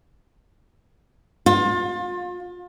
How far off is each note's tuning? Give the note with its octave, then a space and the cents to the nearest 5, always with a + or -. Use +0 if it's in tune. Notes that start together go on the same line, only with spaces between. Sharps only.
F4 +30